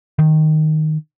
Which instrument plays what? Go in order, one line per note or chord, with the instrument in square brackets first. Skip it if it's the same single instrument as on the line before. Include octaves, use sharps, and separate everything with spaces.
[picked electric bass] D#3